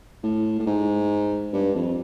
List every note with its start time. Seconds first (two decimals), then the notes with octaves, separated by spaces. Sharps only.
0.23 A2
0.59 A2
0.67 G#2
1.53 G2
1.75 F2